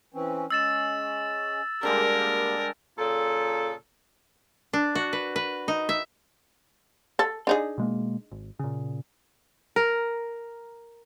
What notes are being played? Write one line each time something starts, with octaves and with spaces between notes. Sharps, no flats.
E3 C4 C#4
G#3 C#4 E6 A6 E7
D3 G3 G#3 A#3 G4 A#4
A#2 C#3 A4
D4
F#4
B4
B4
D#4
E5
A4
D4 D#4 G#4
B2 G#3 A#3
G#1
A#2 C#3
A#4